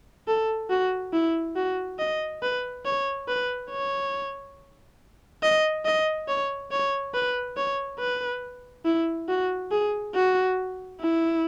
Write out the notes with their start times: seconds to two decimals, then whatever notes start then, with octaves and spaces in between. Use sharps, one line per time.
0.28 A4
0.70 F#4
1.13 E4
1.56 F#4
1.99 D#5
2.42 B4
2.85 C#5
3.28 B4
3.71 C#5
5.43 D#5
5.85 D#5
6.28 C#5
6.72 C#5
7.14 B4
7.58 C#5
7.99 B4
8.85 E4
9.29 F#4
9.72 G#4
10.15 F#4
11.01 E4